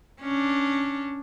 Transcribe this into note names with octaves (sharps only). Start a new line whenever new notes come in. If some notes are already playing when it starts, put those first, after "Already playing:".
C#4 D4